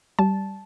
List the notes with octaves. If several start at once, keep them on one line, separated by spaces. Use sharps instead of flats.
G3 A5